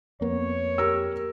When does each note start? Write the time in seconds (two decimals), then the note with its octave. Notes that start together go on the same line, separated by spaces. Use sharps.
0.21 F2 A#3 B3 C#5
0.78 G4 A#4 E6